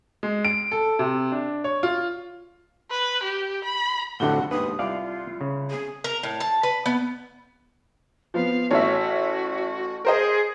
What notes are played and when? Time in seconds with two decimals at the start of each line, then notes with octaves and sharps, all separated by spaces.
0.23 G#3
0.45 D7
0.71 A4
0.99 C3
1.32 D4
1.64 C#5
1.83 F4
2.91 B4
3.23 G4
3.64 B5
4.20 F2 A2 D3 F#4 F#5 G7
4.51 D#2 G#2 B4 D#6
4.79 C2 F4 D5 F5
5.41 C#3
5.70 G#4
6.04 A#4
6.23 A2
6.40 A5
6.63 B4
6.86 B3
8.34 F3 B3 F5
8.71 A1 F#4 C#5 E5
10.05 G#4 A#4 C5 D#5